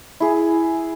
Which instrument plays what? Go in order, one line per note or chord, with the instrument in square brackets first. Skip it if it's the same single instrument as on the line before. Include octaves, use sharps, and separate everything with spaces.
[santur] E4 G#4